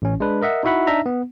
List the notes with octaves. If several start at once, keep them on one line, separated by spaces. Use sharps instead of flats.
A1 C#4
G#3 D4 B4
A#4 D#5 E5 F#5
D#4 E4 F#4 E5 F#5 B5
D4 D#4 E5 A#5
B3